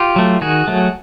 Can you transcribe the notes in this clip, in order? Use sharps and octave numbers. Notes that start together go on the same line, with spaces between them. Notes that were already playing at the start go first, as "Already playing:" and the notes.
Already playing: F4 G4
F#3 A3
D#3 F#4 G#4
F#3 A3